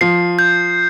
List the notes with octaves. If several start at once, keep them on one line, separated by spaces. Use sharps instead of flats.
F3 C7
G6